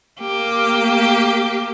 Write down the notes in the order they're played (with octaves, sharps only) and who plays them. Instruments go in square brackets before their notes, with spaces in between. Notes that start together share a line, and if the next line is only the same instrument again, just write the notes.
[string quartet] A#3 G4